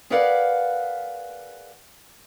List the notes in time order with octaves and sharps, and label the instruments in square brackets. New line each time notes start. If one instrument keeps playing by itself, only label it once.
[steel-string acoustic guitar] G#4 A#4 B4 D5 F5 F#5